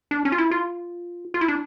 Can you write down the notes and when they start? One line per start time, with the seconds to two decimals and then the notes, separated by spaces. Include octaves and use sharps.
0.11 D4
0.25 C#4
0.32 F4
0.38 E4
0.51 F4
1.34 F4
1.41 E4
1.48 D4